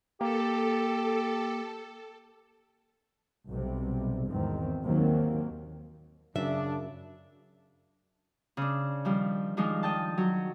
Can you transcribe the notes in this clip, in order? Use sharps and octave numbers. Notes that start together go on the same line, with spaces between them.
A#3 G4 A4
B1 C3 G3
G#1 E2 D#3 C4
D#2 D#3 F#3 A#3 C4
F#2 C#3 D4 E5
C#3 D4
D#3 F3 G3
D#3 F3 G#3 D4 D#4
D#5 G5 A5
F#3